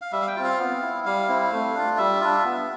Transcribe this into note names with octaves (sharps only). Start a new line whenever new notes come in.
F5
G3 E5
F5
G5
C4 F4
F5
B3
E4
G3 F5
C4 E4
A3
D4 F4
G3 E5
D4 F4
B3